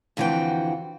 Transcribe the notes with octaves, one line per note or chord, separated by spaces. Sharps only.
F2 D3 E3 F#4 G5